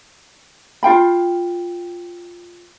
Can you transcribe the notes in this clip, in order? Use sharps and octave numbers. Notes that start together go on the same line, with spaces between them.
F4 F5 G5 B5